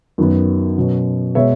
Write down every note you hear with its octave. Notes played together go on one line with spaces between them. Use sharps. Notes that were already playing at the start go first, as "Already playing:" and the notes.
F#2 D#3 F#3 B3
B2 F#3 C#4
B2 G#3 B3 C#5 E5